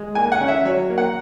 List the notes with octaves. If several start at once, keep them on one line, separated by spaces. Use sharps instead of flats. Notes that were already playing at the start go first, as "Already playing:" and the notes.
Already playing: G#3
A#3 G#5
F#5
C#4
E5
F#3 C#5
A#3
F#5